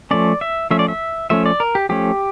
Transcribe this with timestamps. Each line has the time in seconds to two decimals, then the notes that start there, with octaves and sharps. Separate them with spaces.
0.11 F3 A3 C#4 D5
0.41 E5
0.70 F3 A3 C#4 E5
0.79 D5
0.88 E5
1.30 F3 A3 C#4 E5
1.46 D5
1.60 A#4
1.75 G4
1.89 F3 A3 C#4 G4